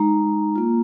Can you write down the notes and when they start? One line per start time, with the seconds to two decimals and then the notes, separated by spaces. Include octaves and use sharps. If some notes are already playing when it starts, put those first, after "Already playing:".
Already playing: G#3 D#4 A#5
0.56 A#3 F4